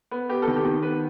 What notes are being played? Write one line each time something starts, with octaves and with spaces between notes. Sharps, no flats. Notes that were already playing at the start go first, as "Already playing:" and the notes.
B3
B3 G4
A4
D#3
G4
D#3
B3 B4